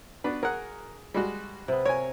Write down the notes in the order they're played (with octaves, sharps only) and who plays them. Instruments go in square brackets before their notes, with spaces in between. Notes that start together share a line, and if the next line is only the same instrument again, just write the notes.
[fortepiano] B3 D4 B4 [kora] F#4
[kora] G#4 [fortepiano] A#4 F#5
[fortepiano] G3 G#3 F#4
[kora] C3 B3
[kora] A#4 [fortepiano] C#5 G#5